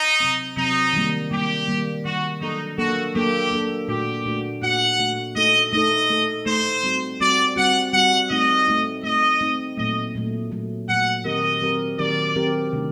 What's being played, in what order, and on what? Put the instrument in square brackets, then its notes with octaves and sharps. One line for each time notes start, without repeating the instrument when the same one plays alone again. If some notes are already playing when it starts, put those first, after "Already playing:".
Already playing: [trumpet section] D#4
[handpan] C3 F#3 C4
[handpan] C3 F#3 C4 [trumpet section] D#4
[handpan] D#3 G3 A#3
[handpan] D#3 G3 A#3 [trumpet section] G4
[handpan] D#3 G3 A#3
[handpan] D#3 G3 A#3 [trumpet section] F#4
[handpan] F#3 A#3 D4 A4 [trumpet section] D#4
[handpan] F#3 A#3 D4 A4 [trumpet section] F#4
[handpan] F#3 A#3 D4 A4 [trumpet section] G4
[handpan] F#3 A#3 D4 A4
[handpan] A#2 A3 D4 F#4 [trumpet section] G4
[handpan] A#2 A3 D4 F#4
[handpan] A#2 A3 D4 F#4 [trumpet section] F#5
[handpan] A#2 A3 D4 F#4
[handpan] A3 D#4 A4 [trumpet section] D#5
[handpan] A3 D#4 A4 [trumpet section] D#5
[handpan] A3 D#4 A4
[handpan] A3 D#4 A4 [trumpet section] C5
[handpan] G3 C4 F#4
[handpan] G3 C4 F#4 [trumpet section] D5
[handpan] G3 C4 F#4 [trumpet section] F#5
[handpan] G3 C4 F#4 [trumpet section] F#5
[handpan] A3 C4 D#4 [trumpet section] D#5
[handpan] A3 C4 D#4
[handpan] A3 C4 D#4 [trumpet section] D#5
[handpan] A3 C4 D#4
[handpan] A#2 F#3 A3 [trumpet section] D#5
[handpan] A#2 F#3 A3
A#2 F#3 A3
[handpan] A#2 F#3 A3 [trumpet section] F#5
[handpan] D#3 F#3 C4 G4 A#4 [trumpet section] D#5
[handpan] D#3 F#3 C4 G4 A#4
[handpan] D#3 F#3 C4 G4 A#4 [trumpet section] D5
[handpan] D#3 F#3 C4 G4 A#4
C3 D#3 A3 D4